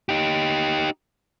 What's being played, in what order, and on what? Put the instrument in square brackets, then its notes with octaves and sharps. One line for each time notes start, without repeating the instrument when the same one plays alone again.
[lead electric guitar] D#4 G4